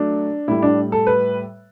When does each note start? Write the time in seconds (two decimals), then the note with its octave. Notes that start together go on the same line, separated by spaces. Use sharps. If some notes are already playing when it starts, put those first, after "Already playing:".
Already playing: F#3 A3 D4
0.48 A2 G3 E4
0.62 D4
0.92 A4
1.07 B4